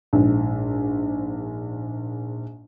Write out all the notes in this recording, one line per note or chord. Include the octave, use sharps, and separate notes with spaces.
A#1 G#2